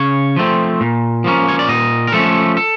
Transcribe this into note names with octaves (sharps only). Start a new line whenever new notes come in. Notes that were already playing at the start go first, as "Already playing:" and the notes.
Already playing: C#3 C#5
F3 A3 C4
A#2
F3 A#3 C#4
C#5
D5
A#2 D#5
A#4
F3 A3 C#4 A4
A4